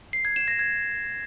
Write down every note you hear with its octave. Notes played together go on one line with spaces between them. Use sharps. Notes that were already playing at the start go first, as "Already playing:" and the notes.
C7
G#6
E7
A#6
G#6